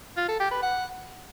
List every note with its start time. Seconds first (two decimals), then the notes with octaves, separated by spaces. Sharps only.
0.17 F4
0.28 A4
0.40 G4
0.51 B4
0.62 F#5